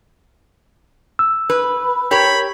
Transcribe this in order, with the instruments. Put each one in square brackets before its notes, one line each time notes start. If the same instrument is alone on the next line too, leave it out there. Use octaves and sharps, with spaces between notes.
[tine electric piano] E6
[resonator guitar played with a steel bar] B4
[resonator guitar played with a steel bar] G4 A#4 C#5 [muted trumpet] B5